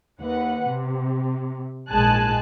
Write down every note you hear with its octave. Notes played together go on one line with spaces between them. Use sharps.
D#2 B4 F#5
C3
A#1 G#2 G#3 G#5 A5 F#6